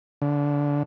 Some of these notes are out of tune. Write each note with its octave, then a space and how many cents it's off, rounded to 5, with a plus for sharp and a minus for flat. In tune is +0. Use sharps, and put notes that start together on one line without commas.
D3 -20